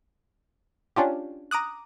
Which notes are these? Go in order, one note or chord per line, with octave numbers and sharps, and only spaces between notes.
C#4 D4 F4 G4
A#5 D6 D#6 F#6